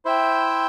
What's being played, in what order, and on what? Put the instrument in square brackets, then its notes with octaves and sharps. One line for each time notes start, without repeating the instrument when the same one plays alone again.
[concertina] E4 C5 E5 G5